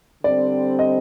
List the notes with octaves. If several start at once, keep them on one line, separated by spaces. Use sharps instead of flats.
D3 G3 C4 D5
D#5